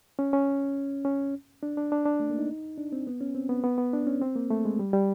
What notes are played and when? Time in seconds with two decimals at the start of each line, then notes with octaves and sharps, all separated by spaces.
0.19 C#4
0.33 C#4
1.05 C#4
1.63 D4
1.77 D4
1.92 D4
2.06 D4
2.20 A3
2.30 A#3
2.39 D#4
2.78 D4
2.92 C4
3.07 B3
3.21 C#4
3.35 C4
3.49 B3
3.64 B3
3.78 B3
3.93 D4
4.07 C#4
4.21 C4
4.36 A#3
4.50 A3
4.65 G#3
4.79 G3
4.93 G3